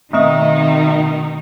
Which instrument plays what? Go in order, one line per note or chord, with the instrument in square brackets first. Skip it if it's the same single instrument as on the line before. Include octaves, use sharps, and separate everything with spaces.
[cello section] B2 D#3 D#4 [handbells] A3 C4 D#6 [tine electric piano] D#5 E5